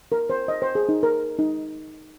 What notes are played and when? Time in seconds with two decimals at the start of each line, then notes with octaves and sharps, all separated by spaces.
0.12 A#4
0.30 C5
0.48 D#5
0.62 C5
0.75 G#4
0.89 D#4
1.03 A#4
1.39 D#4